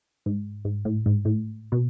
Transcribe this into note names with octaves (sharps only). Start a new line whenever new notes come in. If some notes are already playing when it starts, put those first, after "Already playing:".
G#2
G#2
A2
G#2
A2
B2